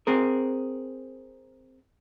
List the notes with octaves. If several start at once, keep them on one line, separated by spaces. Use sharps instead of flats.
C4 G#4 A#4